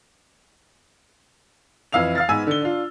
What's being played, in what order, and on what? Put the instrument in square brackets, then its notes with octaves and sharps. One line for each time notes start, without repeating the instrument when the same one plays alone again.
[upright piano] F2 E3 F5 E6 F7
F5 F6 A6
G#2 B3 B4 G#5 E6
D3 G7
D4 F4